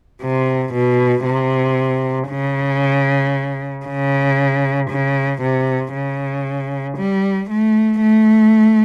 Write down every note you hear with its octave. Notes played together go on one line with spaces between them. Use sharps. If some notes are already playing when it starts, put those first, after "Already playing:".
C3
B2
C3
C#3
C#3
C#3
C3
C#3
G3
A3
A3